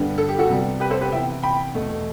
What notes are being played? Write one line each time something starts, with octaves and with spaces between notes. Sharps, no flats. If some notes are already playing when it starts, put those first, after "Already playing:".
Already playing: G2 D3 G3 B3
A4
G4
F#4 A4
C3 G3 B3
G4 B4
A4 C5
G4 B4
C3 E3 B3 E5 G5
G5 B5
E2 B2 A3